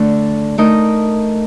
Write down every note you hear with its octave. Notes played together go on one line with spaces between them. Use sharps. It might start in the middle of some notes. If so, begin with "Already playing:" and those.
Already playing: D3 A3 D4
A3 D#4 A#4 D#5